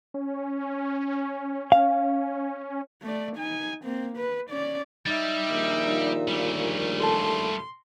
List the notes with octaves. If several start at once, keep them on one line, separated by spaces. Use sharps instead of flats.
C#4
F5
A3 D5
D#4 G#5
A#3 C4
B4
C#4 D5
G3 D#4 E5 A6
A#1 D#2 A#2
G3 A3
A4 A5 C6